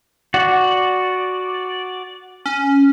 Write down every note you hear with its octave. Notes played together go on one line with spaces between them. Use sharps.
F#4 D5
C#4